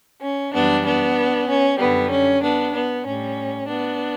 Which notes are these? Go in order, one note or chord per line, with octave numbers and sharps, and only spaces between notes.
C#4
F#2 E3 G3 B3 D4
B3 D4
C#4
F#2 D3 G3 B3
C#4
B3 D4
B3
A2 G3 C#4
B3 D4